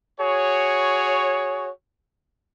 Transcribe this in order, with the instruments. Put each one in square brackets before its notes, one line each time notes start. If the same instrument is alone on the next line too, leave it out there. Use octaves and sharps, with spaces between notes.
[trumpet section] F#4 G#4 C#5